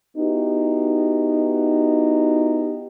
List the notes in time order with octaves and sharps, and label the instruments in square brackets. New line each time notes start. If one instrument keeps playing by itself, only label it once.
[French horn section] B3 D#4 E4 F#4 G4